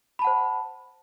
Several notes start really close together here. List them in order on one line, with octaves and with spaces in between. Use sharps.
B5 A5 F#5 C5